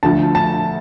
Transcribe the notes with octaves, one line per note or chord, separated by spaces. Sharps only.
D2 D3 F3 A5
A5